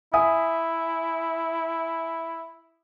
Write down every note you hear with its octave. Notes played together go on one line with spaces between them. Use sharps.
E4 E5 G#5 D#6